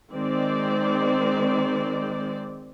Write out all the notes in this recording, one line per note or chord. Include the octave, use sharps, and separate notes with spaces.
D#3 G#3 C4 D5